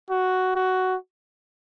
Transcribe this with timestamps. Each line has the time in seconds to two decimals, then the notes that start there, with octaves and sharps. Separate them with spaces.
0.10 F#4
0.56 F#4